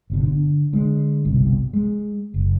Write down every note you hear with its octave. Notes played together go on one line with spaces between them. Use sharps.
G1 B2 D3
D3
D3 G#3
G1 C2 B2
G#3
F#1